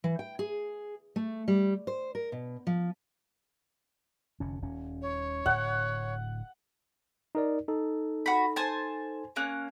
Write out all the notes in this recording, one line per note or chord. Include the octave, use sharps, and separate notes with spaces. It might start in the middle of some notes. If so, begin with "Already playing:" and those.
E3
G5
G#4
A3
G3
C5
A#4
B2
F3
F1 D3 C#4
D#1 C#4
C#5
D1 F#5
D#4 A#4 D5
D#4 A4
F#4 B5
C5 G#5 A5
A#3 C#4 F#6